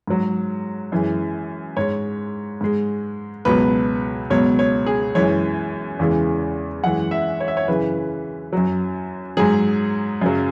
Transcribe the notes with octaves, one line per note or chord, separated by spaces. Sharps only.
G#2 F#3
F#2 E3 G#3
G#2 G#3 C#5
G#2 G#3
C#2 B2 F#3 B4
C#2 B2 F#3 C#5
C#5
G#4
F#2 E3 G#3 C#5
E2 C#3 E3 G#3
F#2 E3 G#3 F#5
E5
C#5
E5
C#5
F#2 C#3 E3 B4
F#2 F#3
G#2 F#3 G#4
F#2 C#3 F#3